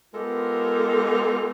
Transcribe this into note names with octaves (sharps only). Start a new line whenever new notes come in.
G#3 B3 F4 G4 A4 A#4